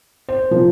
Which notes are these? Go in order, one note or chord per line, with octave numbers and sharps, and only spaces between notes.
C5
A#2 F3 A#3